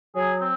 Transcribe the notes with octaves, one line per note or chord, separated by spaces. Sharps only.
F#3 G#4
C4